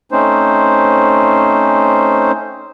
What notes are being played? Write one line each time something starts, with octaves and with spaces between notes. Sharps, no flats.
A3 C4 C#4 D#4 C5